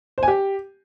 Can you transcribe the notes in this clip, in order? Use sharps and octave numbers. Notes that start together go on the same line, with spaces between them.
C5
G#5
G4